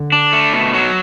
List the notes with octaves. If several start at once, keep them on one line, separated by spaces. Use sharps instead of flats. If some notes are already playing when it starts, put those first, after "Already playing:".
Already playing: D3
D4
A3
B2
F#3